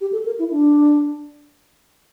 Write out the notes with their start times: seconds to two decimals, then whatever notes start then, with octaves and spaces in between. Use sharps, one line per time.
0.01 G4
0.13 A4
0.25 A#4
0.39 E4
0.51 D4